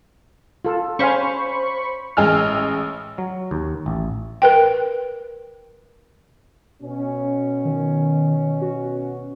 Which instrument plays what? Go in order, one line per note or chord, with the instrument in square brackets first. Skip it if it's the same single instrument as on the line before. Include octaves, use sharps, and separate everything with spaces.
[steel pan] F4 A4
[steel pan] C#4 F5 G#5 [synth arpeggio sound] C5 B5 C#6
[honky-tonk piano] A1 G#3 D#5 G#5 E6 F6
[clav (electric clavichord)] F#3
D#2
A1
[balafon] A#4 B4 G5
[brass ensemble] B2 C#4
[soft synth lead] D#3
F#4